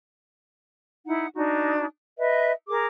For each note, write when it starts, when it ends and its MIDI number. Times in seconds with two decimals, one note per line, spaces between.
1.07 1.27 63
1.07 1.27 64
1.07 1.27 78
1.36 1.85 62
1.36 1.85 63
1.36 1.85 66
2.18 2.51 71
2.18 2.51 75
2.18 2.51 76
2.69 2.87 68
2.69 2.87 70
2.69 2.87 86